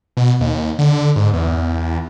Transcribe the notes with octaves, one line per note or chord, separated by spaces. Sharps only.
B2
D#2
D3
G#2
E2